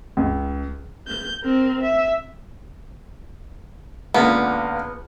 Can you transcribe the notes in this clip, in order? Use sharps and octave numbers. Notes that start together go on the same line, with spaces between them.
C#2
G6
C4 A#4
E5
C#2 D3 A#3 B3